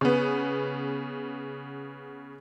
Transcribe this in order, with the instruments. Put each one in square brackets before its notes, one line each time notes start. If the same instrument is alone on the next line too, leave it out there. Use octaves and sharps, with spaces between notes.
[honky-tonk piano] C#3 B3